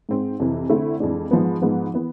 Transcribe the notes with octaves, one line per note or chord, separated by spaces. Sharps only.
G#2 G#3 C4
F2 C3 E3
D3 A3 C4 E4
F2 E3 G#3 D4
G#2 F3 G#3 B3
G#2 F3 G#3 B3
E3 B3